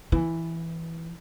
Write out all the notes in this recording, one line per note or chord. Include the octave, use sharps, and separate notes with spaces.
E3